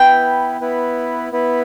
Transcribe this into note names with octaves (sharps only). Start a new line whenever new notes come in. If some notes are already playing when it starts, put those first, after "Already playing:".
Already playing: B3 E4 B4 G5
B3 E4 B4
B3 E4 B4